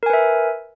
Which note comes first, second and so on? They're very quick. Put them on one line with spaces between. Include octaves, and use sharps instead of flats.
A#4 G#5 B4 E5